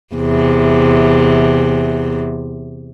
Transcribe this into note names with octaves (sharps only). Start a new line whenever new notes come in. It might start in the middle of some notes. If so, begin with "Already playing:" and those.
E2 C3